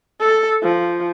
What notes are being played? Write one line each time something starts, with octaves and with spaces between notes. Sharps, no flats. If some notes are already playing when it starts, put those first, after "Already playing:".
A4
F3